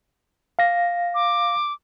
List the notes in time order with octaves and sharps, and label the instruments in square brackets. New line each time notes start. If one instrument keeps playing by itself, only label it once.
[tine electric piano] F5 A#6
[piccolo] D6